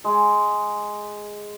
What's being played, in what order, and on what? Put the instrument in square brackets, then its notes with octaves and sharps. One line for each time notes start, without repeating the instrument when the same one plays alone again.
[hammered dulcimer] G#3